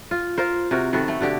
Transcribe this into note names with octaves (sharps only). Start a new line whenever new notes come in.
F4
F4 A#4 C5
C3 F#4 A#4
D#3 B3 F#4 A4
A3
B2 D3 G4